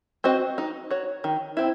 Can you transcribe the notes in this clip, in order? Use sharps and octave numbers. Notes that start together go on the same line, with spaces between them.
C4 F#4 C5 D#5
D#4
F#4 C#5
D#3
C4 E4